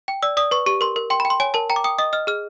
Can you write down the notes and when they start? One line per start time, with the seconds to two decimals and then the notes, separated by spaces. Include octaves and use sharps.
0.08 G5
0.23 D5 E6
0.37 D5 D#6
0.51 B4 C#6
0.66 G4 C#6
0.81 A#4 C6
0.96 A#4
1.10 G5 C6
1.20 B5
1.25 G5
1.30 C6
1.40 C#5 G#5
1.54 A#4 A5
1.70 G5 A#5
1.76 D6
1.84 G5 D#6
1.99 D#5 D#6
2.13 D#5 F6
2.27 G#4 F6